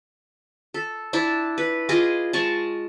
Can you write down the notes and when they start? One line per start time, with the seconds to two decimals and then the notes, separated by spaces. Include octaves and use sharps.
0.74 A4
1.13 D4 E4 A5
1.58 B4
1.89 F4 G#4 D#5 D6
2.33 G#3 A5 C#6